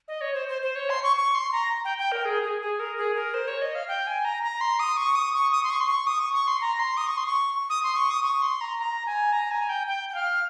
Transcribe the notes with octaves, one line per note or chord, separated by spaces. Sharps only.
D#5
C#5
C5
C5
C5
C#5
C6
C#6
C#6
C6
A#5
G5
G5
A#4
G#4
G#4
G#4
A#4
G#4
A#4
C5
C#5
D#5
F5
G5
G#5
A#5
A#5
C6
D#6
C#6
D#6
C#6
D#6
C6
C#6
C6
C#6
D#6
C#6
C#6
C6
A#5
C6
D#6
C#6
C6
C#6
D#6
C6
C#6
D#6
C#6
C6
A#5
A#5
G#5
A#5
G#5
G5
G5
G5
F5